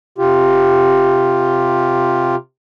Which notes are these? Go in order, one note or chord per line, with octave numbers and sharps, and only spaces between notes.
C3 F4 G4